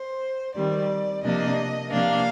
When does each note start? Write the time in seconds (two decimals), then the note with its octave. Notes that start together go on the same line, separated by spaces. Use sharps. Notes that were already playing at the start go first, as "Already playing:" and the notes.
Already playing: C5
0.55 D#3 G3 C4 D5
1.23 C3 F3 A#3 D4 D#5
1.92 C3 F3 A#3 D4 F5